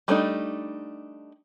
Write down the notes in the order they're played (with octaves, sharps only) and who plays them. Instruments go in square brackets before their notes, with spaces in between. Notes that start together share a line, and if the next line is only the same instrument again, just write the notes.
[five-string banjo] G3 A3 C4 D4 D#4